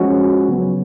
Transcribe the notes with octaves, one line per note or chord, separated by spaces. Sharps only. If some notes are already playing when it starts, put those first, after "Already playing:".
Already playing: F3 G#3 C#4 F#4
C#3 F#3 B3